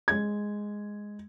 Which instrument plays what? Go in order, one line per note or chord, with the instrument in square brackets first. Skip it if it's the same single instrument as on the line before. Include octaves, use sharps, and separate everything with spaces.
[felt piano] G#3 G#6